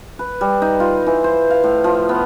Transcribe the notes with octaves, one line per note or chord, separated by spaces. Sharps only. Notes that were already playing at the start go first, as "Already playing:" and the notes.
B4
G3
D#4
F4
E3
C5
F5
A2
F3
B3